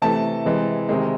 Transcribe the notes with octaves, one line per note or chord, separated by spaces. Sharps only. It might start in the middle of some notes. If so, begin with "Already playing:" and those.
C3 E3 A3 A5
C3 E3 G#3
C3 D#3 G#3